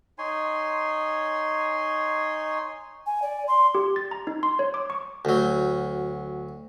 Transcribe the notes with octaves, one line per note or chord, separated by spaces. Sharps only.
D#4 C#5 G#5 C6
G#5
D5
C6
G4
A6
A#5
D#4
C6
C#5
D6
C#6
D2 F#3